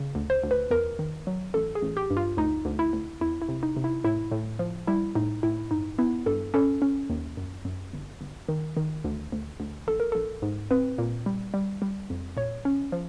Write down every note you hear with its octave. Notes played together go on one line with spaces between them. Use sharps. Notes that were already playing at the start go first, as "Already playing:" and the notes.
Already playing: C#3
D2
C5
D2
B4
E2 A#4
D#3
F#3
A1 A4
G#4
A1
G4
G2
F4
D2 D#4
D2
E4
D2
E2 E4
E4
C3
D#4
C3
E4
A2 E4
A2
F3
G3 E4
A2 D#4
A2 E4
G2 D#4
B3 E4
G2 A4
C#4 A4
C#4
D#2
F#2
F#2
G1
G1
D#3
D#3
D2
D2
D2
A#1 A4
A#4
A#1 A4
G#2
C4 B4
A#2
G3
G3
G3
F2
A#2 C#5
C#4
F3